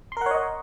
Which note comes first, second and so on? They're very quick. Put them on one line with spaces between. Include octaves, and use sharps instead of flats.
C6 A#4 F#5 C#5 D#5